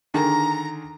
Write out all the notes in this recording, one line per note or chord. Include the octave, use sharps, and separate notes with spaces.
D3 D#3 G#4 A#5